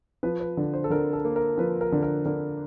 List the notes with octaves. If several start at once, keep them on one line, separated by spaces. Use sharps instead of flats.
F3 B4
B4
D3
C5
A4
D3 A#4
A4
A#3
A#4
F3 B4
A#4
D3
A#4
D3 A#4